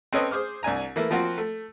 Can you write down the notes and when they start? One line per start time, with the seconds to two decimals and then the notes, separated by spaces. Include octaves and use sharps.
0.13 C4 C#4 A4 B4 C#5 D#5
0.31 G#4 C5 D6 F6
0.63 C2 D4 G#5 A#5
0.96 E3 A3 A#3 E4
1.11 F3 A#3 C4 F4 F#4
1.38 A3